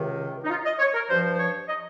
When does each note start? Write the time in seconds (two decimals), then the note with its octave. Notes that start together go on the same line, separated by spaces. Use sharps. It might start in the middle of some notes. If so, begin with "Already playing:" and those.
Already playing: C#2 C3 D#3
0.45 D#4
0.49 F4
0.65 D#5
0.79 C#5
0.94 A#4
1.09 G2 F3 C5
1.34 C5
1.39 C#5
1.68 D#5